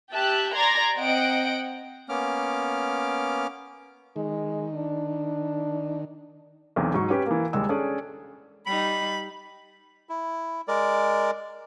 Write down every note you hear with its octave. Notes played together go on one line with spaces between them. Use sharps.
G4 E5 A5 F#6
D5 A#5 C6 G#6 A#6
C4 D#5 F#5 G5 D7
A#3 B3 C#4 D6 F6
D#3 G#3
D4
B1 E2 C4
G#2 F#3 C#6
C#4 G4 B4
E3 A#3
D#2 G3 G#3 E6
C#4 D4 G#4 A4 D5
G3 D#4 B5
E4
G#3 A#4 D5